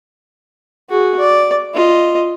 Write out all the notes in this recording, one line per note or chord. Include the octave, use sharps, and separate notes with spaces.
F#4 G#4
D5
F4 D#5